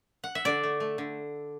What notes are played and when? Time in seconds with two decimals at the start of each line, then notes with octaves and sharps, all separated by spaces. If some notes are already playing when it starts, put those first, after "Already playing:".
0.24 F#5
0.35 E5
0.45 D3 D5
0.63 A3
0.80 A3
0.98 D3